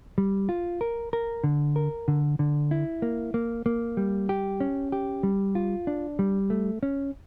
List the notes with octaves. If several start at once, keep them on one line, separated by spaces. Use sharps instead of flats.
G3
F4
A#4
A#4
D3
A#4
D3
D3
E4
A#3
A#3
A#3
G3
G4
C#4
G4
G3
F4
D4
G3
A3
C#4